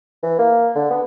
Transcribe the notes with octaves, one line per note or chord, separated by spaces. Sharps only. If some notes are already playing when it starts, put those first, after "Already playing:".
E3
A#3
D3
B3